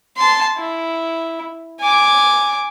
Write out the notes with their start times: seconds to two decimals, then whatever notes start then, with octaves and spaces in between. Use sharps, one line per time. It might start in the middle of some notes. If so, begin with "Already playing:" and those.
0.17 A5 C6
0.58 E4
1.81 G#5 D6